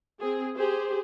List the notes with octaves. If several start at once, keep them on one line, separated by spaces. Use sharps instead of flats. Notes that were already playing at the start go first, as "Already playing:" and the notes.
C4 G#4
G4 G#4 C5